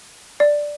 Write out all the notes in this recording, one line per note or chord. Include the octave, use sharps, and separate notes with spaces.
D5